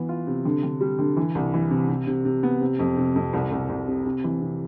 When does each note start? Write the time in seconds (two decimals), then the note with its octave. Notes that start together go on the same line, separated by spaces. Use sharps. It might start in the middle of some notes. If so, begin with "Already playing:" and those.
Already playing: E3 B3
0.09 F4
0.27 C3
0.45 D3
0.63 D3
0.81 G3
0.99 D3
1.17 E3
1.35 C2
1.54 E3
1.71 C3
1.89 C3
2.07 C3
2.25 C3
2.43 B3
2.61 C3
2.79 F2
2.97 C3
3.16 F2
3.33 C2
3.51 C2
3.69 C2
3.88 C3
4.06 C3
4.24 E3
4.42 C3